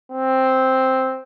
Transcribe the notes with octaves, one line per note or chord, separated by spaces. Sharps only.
C4